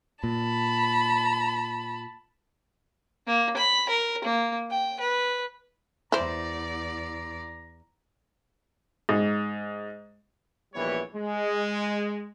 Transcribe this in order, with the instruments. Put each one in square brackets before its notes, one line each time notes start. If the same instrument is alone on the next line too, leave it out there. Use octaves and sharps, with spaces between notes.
[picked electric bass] A#2 [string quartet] A5 B5
[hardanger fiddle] A#3
B5
A#4
A#3
G5
B4
[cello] E2 D5 [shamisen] E4 C5 [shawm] A#5
[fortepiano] G#2
[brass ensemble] A#1 E3 G3 B3 C#5
G#3